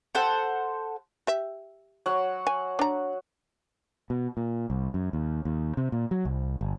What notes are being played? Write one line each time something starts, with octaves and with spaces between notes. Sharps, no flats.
A4 C5 F#5
G4 E5
F#3 F#5
G#5
D4 A#5
B2
A#2
C2
F#2
D#2
D#2
C3
A#2
F#3
C2
G1